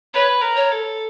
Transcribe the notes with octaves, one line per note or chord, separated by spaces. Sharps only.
B4 C#5
A#4
C#5
A4